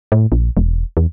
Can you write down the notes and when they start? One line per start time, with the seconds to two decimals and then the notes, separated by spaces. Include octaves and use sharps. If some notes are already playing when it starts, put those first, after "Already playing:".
0.12 A2
0.32 A#1
0.57 E1
0.97 E2